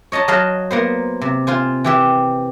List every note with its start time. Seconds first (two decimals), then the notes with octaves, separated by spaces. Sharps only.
0.12 C#5 D#5 A5 A#5
0.28 F#3 D#5 F5 A5 B5
0.71 A#3 B3 C5
1.21 C3
1.47 F4 C5 G#5
1.84 E3 G4 E5